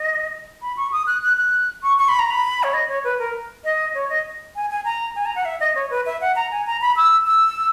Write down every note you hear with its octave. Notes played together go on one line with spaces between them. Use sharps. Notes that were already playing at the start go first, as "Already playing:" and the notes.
Already playing: D#5
B5
C#6
D#6
F#6
F#6
F#6
C#6
C#6
B5
A#5
B5
C#5
D#5
C#5
B4
A#4
D#5
C#5
D#5
G#5
G#5
A#5
G#5
A#5
F#5
E5
D#5
C#5
B4
E5
F#5
A#5
G#5
A#5
B5
E6
E6